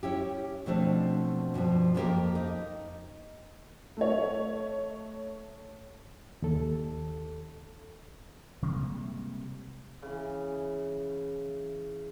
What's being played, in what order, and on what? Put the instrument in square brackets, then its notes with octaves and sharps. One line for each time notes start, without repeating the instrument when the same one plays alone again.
[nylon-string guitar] C#4 E4 G4
B2 F3 A3 C4 D4
G2 B2 D3 F3
F2 A#3 B3 G4 A#4
D#4
[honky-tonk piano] A3 C#5
[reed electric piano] D#2 A4
[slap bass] C3 G3 G#3 A#3
[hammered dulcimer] C#3 E3